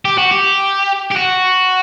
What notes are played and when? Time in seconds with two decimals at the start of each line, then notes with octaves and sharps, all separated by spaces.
0.05 G4
0.18 F#4
0.32 G4
1.11 G4
1.16 F#4